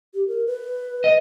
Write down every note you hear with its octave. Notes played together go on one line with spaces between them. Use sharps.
G4
A#4
B4
D#5